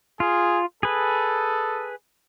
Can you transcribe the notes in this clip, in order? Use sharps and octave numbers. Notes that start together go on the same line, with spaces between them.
F4 G#4
G#4 A4 B4